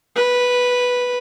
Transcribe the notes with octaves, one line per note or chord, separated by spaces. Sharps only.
B4